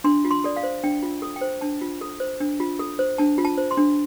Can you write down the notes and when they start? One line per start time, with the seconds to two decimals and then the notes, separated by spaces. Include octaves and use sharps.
0.04 D4 C6
0.25 F4
0.31 C6
0.44 A4 D5
0.56 F5
0.63 C5
0.84 D4 G5
1.03 F4
1.22 A4
1.36 G5
1.41 C5
1.61 D4 A5
1.81 F4
2.01 A4
2.20 C5
2.40 D4
2.60 F4
2.79 A4
2.99 C5
3.18 D4 A5
3.38 F4
3.45 A5
3.58 C5
3.71 C6
3.77 D4